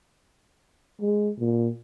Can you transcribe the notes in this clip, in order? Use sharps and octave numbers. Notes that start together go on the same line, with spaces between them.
G#3
A#2